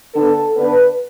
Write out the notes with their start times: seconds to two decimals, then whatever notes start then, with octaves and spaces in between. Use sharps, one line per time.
0.13 D3 B3 D4 A4
0.56 D3 B3 D4 B4